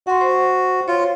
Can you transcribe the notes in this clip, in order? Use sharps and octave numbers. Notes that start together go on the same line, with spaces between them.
F#4 F#5 C6
C5
F4 C#5